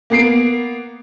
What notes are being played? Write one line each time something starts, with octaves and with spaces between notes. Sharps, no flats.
A#3 B3 C7 D7